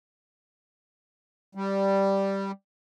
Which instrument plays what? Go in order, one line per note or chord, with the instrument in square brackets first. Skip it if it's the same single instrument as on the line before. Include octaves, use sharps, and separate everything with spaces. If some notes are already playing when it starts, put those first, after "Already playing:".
[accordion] G3